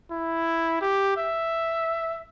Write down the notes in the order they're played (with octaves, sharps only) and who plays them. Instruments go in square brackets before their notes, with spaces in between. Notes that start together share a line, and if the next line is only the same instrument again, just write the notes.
[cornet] E4
G4
E5